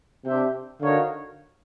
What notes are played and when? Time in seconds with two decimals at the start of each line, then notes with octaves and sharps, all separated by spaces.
0.25 C3 D4 G4 C5 E5 G5
0.81 D3 D#4 F#4 A#4 C#5 F5